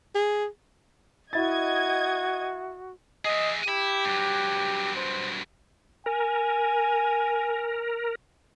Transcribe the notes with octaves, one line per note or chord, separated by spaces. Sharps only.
G#4
E4 F#4 D#5 G#6 A6
G#4 D#5 E5
E4 G4
G2 F#3
C5
A#4 G#5